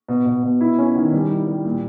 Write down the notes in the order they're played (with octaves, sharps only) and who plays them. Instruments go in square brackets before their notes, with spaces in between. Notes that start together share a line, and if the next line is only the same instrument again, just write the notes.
[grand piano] B2
B2
B2
E4
C#4
D#3
G3
E4
G3
A#2